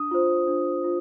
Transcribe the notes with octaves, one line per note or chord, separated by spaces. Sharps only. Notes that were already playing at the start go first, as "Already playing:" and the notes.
Already playing: D4 D#6
F4 C5
D4
F4